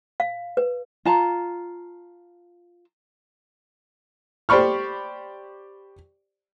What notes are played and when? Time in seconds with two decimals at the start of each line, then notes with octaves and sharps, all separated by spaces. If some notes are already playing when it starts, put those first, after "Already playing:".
0.20 F5
0.57 B4
1.05 F4 A5 A#5
4.49 G4 C5 D5 B5 C#6 F6